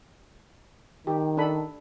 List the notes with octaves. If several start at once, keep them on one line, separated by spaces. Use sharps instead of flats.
D#3 G4
D4 A4 B5